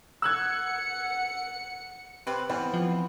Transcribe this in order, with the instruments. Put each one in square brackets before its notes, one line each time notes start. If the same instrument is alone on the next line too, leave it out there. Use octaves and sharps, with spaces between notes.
[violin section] F#5 C#7 [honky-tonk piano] E6 F#6 G#6
[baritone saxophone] C3 [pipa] C4 B4
[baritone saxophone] E3 [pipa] G3 [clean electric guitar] B3 C4
[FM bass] F3